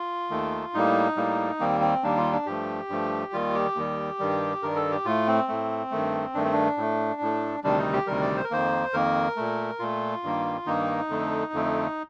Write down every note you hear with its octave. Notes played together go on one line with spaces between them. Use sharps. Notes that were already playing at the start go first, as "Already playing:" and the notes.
Already playing: F4
D#2 D#3 A3
A2 G3 A#3 D#4
A2 G3 A#3
D#2 D#3 G3 A#3 C4
C4
D#2 D#3 G3 A#3 D4
F4
D4
G2 F3 A3 G4
G2 F3 A3
D#2 D#3 G3 F4
G4
D#2 D#3 G3
G2 D#3 G3
G2 D#3 G3 A#4
A4
G4
A2 A3 F4
C4
A2 A3
G2 D#3 A3
G2 D#3 A3 D4
C4
D4
A2 A3
A2 A3
D2 C3 D#3 G3 D4
D#4
G4
D2 C3 D#3 G3 A#4
D5
C5
A#4
F2 D#3 A#3 C5
F2 D#3 A#3 A#4
A#2 A3
A#2 A3 F4
G2 D#3 A#3
G2 D#3 A#3 D#4
F2 D3 A3
F2 D3 A3